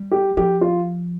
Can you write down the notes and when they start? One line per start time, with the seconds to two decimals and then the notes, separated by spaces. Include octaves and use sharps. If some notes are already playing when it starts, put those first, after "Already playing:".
Already playing: G3
0.11 G4
0.37 F3 G4
0.61 F4